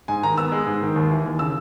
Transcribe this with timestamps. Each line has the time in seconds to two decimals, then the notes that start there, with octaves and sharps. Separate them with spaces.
0.08 G#2 G#5
0.23 D#3 A#5
0.37 B3 E6
0.52 G#3
0.66 G#2
0.82 D#3
0.96 D#2
1.11 E3
1.26 D#2
1.39 C#3 E6